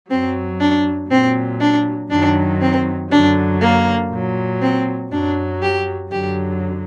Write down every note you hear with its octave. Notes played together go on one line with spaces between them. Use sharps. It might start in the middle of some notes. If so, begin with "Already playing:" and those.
F#2 F#3 C4
D4
A#2 F#3 C4
D4
F#2 D#3 F#3 D4
C4
F#2 D3 F#3 D4
A#3
A#2 F#3
C4
F#2 F#3 D4
G4
F#2 D3 F#3 G4